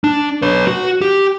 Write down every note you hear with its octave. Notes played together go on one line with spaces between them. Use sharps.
D4
B4 C#5
F#4
G4